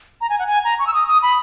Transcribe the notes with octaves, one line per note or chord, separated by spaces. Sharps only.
A#5
G#5
F#5
G#5
A#5
C#6
E6
D#6
D#6
B5